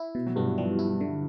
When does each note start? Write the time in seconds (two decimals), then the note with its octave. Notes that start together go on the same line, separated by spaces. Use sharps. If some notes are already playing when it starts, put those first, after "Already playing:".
Already playing: E4
0.15 B2
0.26 F#3
0.36 G2 G3 B3
0.48 F#3
0.57 F3 G3
0.79 E4
1.01 D3